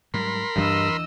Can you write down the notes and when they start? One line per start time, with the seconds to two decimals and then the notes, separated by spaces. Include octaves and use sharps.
0.14 G#2 F#3 G3 A#4 B5 C6
0.56 D2 G2 E3 D4 D#5 E6